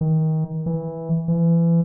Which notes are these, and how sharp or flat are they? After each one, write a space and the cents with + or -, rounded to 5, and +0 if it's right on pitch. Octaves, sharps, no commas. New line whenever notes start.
D#3 +25
E3 -10
E3 +30